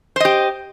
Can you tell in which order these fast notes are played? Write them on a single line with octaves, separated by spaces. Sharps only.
C5 D#5 G4